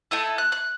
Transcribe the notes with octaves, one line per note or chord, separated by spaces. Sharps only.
A3 E4 A4 D#6
F#6
F#6